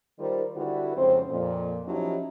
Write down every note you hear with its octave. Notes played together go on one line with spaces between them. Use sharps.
D#3 G3 F4 A#4 C5
D3 G3 E4 F#4 B4
F2 G#2 C#3 C4 C5
F2 A#2
F3 F#3 C#4 D#4 E4 G4